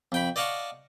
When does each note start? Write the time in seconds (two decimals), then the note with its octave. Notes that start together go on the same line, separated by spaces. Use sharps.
0.12 F2 G5 B5
0.36 D5 D#5 F5 F#5 A5 C#6